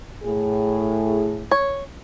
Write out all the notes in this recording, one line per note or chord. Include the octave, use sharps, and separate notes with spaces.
A2 G#4
C#5